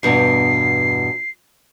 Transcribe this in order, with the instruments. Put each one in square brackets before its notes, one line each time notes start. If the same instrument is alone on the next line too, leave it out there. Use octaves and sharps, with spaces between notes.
[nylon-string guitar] E2 G2 B2 [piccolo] C7